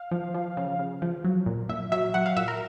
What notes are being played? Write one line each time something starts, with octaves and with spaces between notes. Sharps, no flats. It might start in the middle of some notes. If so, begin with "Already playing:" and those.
Already playing: F5
F3
F3
C#3
C#3
F3
F#3
A#2
A#2 E5
F#3 E5
F#3 F#5
F5
A#2 E5
A#4